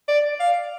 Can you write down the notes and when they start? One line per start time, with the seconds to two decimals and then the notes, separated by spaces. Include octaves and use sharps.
0.08 D5
0.40 F5